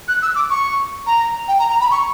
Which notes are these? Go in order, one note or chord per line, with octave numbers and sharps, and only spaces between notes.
F#6
E6
D6
C#6
A#5
G5
A#5
A#5
B5
C#6